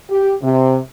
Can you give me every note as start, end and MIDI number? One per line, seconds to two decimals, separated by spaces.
0.10 0.33 67
0.42 0.78 48